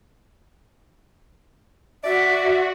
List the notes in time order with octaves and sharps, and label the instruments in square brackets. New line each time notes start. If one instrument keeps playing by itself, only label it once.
[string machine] F#4 [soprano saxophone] D5 [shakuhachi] E5